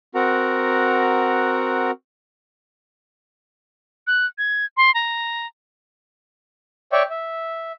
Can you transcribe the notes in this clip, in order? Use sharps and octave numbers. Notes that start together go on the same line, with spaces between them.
C4 F#4 A#4 F#5 A#5
F#6
G#6
C6
A#5
C#5 D5 E5 G5 C#6
E5